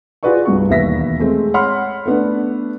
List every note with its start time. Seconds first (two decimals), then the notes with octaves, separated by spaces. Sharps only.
0.23 F4 F#4 G#4 B4 D5 C#6
0.46 C2 G2 B3 C#6
0.68 E1 D#2 B3 E5 A#6 B6
1.20 G#3 A3 C4
1.54 C#5 F#5 B5 C6 F6
2.05 A3 B3 D4